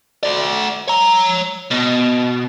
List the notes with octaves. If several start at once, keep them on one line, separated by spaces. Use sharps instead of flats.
F#4 D5
C#5 A#5
B2